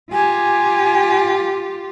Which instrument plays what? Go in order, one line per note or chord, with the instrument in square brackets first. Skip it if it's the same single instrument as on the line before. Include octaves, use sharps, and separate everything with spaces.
[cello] F4 G4 [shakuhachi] G#5